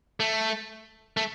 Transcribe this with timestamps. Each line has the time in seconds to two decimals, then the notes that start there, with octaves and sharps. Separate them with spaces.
0.20 A3
1.17 A3